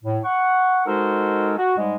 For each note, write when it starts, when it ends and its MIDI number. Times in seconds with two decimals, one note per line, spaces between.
0.03 0.18 45
0.24 0.80 78
0.24 0.80 85
0.86 1.52 56
0.86 1.52 63
0.86 1.52 66
0.86 1.52 69
0.86 1.52 70
0.86 1.52 72
1.57 1.76 66
1.77 1.96 44
1.77 1.96 55
1.77 1.96 56